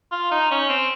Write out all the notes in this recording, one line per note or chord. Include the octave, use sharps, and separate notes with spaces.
F4
D#4
C#4
C4